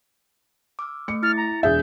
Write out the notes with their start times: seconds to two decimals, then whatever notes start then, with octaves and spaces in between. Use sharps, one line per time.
0.79 D6 E6 F6
1.08 A3 D6 C#7
1.23 E4 F6 A6
1.37 A#5
1.63 E1 G#4 E5 G6